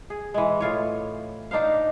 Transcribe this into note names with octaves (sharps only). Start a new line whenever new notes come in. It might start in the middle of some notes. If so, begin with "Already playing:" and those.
G#4
E3 G#3
A2 E3 F4 C#5
D4 D#4 C5 F5